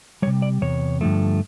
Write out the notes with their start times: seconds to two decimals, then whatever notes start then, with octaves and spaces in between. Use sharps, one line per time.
0.22 C3 E3 G3 C#5
0.42 D5
0.62 E2 C3 C#5
1.01 G2 D3 F3 A3